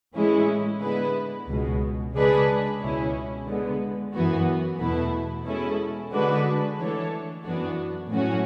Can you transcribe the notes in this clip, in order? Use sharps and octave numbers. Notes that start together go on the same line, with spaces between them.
A2 E3 G#3 C#4 E4
D3 G#3 B3 E4 B4
C#2 B2 G#3
C#3 G#3 D4 G#4 B4
C#2 B2 G#3 C#4 E4
D3 G#3 B3
F#2 E3 B3 F#4
E2 B2 A3 E4 B4
B2 G#3 C#4 E4 A4
D3 G#3 D4 F#4 B4
E3 A3 D4 A4 C#5
F#2 E3 B3 D4 F#4
A2 F#3 C#4 F#4